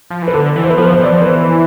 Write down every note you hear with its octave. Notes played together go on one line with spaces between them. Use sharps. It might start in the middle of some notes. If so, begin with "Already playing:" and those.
F3
E3
B4
D3 A4
E3
C5
B4
F3 A4
B4
C5
E3 D5
F3 C5
E3 B4